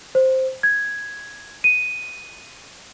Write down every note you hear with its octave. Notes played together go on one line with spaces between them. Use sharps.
C5
G#6
D#7